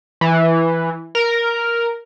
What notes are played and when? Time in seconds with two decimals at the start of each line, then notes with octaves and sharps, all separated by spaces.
0.21 E3
1.15 A#4